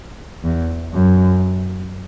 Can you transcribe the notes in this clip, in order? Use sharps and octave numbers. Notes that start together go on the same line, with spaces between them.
E2
F#2